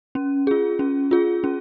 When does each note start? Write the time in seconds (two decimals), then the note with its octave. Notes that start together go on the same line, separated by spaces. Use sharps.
0.15 C#4
0.47 F4 G#4
0.79 C#4
1.11 F4 G#4
1.44 C#4